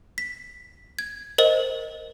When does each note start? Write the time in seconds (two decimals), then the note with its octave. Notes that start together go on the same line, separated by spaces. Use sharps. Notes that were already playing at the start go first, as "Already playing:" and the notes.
0.18 B6
0.99 G#6
1.38 A#4 C5 D#5